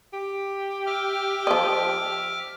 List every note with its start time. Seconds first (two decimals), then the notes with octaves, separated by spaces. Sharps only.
0.13 G4
0.86 E5 D6 F6
1.47 F3 D#5